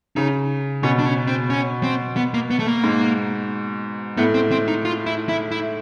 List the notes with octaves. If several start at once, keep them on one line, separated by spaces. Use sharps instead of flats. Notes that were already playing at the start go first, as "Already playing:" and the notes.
C#3 D#4
B2 C#4
D4
C#4
C4
C#4
C4
B3
A#3
B3
A3
A#3
G#2
A2 B3
C4
C4
D#4
F4
E4
E4
E4